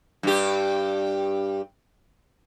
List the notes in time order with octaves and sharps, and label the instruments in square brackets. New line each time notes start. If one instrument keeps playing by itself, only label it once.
[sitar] G2 G4